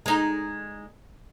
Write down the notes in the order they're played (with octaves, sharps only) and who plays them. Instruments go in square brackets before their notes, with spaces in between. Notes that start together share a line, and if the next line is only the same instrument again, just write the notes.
[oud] G#3 D#4